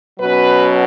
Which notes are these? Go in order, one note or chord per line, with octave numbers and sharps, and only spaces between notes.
B2 F#3 C#4 B4